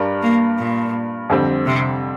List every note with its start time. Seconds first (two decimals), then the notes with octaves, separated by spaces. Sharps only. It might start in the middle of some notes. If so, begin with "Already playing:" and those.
Already playing: G2 G3 D4 A#4
0.22 A#3
0.59 A#2
1.30 F2 D3 G3 C4
1.66 C3